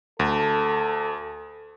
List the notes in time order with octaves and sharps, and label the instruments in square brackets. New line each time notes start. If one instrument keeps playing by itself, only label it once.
[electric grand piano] D2 [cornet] A4